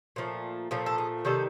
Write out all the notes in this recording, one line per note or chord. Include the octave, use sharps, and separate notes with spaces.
A#2 F3 A3
A#2 F3 A3
A4
G#4
C3 D#3 G3 A4